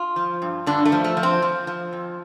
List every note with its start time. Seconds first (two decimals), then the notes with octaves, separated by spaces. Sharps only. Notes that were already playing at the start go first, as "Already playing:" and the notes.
Already playing: F4
0.16 F3
0.42 G2
0.66 G2 D3 D4
0.85 A3
0.92 F3
1.04 A3
1.17 F3
1.23 C4
1.42 F3
1.67 F3
1.93 F2